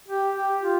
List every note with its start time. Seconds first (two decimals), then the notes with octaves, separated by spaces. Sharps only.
0.08 G4
0.36 G4
0.62 F4